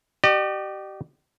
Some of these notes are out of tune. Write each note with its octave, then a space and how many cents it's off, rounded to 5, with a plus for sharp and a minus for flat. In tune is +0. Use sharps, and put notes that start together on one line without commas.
G4 -30 D5 +45